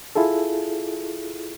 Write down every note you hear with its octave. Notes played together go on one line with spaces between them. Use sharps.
E4 F4 G#4 A4